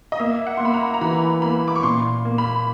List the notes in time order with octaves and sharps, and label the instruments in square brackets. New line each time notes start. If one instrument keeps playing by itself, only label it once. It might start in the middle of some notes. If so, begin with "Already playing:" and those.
[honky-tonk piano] D#5
[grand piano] A#3 [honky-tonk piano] E5
[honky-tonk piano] F#5
[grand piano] A#3 [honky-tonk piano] C6
[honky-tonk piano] B5
A#5
A#5
[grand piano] E3 [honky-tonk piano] B5
[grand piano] A#3 [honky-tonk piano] B5
[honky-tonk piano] D6
C#6
[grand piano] A#2 [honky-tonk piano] C6
[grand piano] A#3
[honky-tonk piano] B5